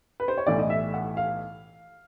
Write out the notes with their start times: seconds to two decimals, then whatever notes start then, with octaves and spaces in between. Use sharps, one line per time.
0.20 B4
0.28 C5
0.38 C#5
0.47 B1 A2 E3 D5
0.59 D#5
0.70 E5
0.94 F#5
1.17 F5